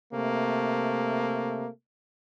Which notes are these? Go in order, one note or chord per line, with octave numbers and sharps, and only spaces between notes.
C3 A3 A#3